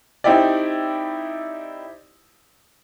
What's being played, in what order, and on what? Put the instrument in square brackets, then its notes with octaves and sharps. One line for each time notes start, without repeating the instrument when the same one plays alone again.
[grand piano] C4 D#4 E4 G4 D5